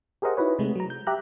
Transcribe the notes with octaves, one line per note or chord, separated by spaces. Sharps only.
G4 G#4 A#4 C5 D#5 F#5
D#4 E4 F#4 B4 C#5
C3 G#3 A3
F#3 A#5
G6
G4 E5 A#5 F#6